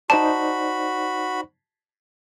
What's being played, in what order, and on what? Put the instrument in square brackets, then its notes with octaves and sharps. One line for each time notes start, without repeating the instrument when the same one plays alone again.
[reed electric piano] D#4 C5 D5 [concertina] F#4 B5 [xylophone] A5